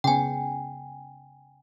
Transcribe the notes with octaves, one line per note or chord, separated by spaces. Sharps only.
C#3 B3 G5 G#5